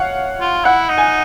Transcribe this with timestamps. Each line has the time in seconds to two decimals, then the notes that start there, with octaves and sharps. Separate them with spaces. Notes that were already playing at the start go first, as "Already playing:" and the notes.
Already playing: C#5 F5 F#5
0.41 F4
0.64 E4 F#5
0.89 D#4
0.98 G#5